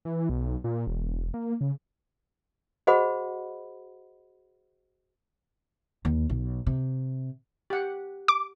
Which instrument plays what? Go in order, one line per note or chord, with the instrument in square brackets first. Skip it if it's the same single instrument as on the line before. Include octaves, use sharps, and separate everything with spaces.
[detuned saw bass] E3
B1
A#2
E1
A#3
C#3
[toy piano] F#4 G#4 C5 D#5 F#5 B5
[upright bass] D#2
B1
C3
[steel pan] G4 F#5
[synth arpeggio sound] D6